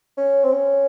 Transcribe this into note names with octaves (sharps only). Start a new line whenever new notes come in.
C#4
C4
C#4